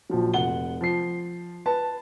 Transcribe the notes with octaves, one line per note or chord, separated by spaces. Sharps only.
A#1 F3 F#3
F1 F#5 G7
F3 C7
B4 A5